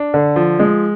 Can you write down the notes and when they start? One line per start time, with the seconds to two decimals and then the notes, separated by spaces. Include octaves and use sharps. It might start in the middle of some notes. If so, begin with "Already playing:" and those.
Already playing: D4
0.14 D3
0.36 F3
0.59 G#3